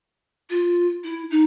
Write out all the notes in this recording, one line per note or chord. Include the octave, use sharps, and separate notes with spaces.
F4
E4
D#4